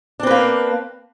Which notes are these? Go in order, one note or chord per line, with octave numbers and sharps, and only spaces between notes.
A#3 C4 D4 B4